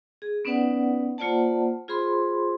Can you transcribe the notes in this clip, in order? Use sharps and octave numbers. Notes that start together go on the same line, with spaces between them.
G#4
B3 C#4 D#4 B4 D5 F#5
A#3 F4 C5 D5 F#5 A5
F4 G#4 C5 B5 C6